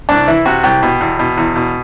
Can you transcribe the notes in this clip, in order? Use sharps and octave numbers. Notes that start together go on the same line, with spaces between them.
C2 D4
E3 E4
C3 F#4
C2 G4
B2
E2
B2
E2
B2